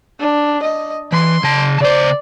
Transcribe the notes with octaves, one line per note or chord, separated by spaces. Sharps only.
D4
D#5
E3 C6
C#3 A5
C#3 C5 D5